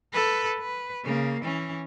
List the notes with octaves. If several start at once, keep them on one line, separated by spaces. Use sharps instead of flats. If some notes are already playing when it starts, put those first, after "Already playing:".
A4 B4
B4
C#3 A#3
E3 C#4